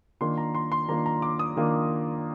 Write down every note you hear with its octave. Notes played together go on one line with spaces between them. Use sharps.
D#3 A#3 D4 F4 C6
A#5
C6
C6
D#3 A#3 D4 F4 A#5
A#5
D6
D#6
D#3 A#3 D4 F4